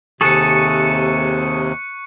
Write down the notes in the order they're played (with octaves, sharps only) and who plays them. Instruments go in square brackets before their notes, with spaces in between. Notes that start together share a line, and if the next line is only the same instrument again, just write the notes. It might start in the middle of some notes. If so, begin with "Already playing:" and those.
[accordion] D#2 C3 [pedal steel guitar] G#4 A4 [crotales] C#6 F#6 C#7